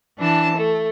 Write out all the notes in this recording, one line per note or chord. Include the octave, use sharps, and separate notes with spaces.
E3 D4 A5
A3